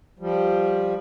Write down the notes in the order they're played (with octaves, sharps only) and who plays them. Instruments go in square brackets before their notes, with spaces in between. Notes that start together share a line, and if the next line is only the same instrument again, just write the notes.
[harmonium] F3 G3